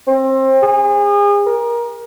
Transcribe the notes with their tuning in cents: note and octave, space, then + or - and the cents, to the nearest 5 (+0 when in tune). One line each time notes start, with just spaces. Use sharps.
C4 +25
G#4 -35
A#4 +20